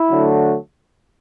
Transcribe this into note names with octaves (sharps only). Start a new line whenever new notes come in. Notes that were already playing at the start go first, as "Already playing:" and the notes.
Already playing: E4
D3 F#3 A3